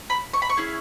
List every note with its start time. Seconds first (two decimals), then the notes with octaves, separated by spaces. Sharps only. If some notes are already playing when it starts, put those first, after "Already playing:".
0.10 B5
0.33 C#6
0.42 B5
0.50 C#6
0.57 C#4 E4 G#4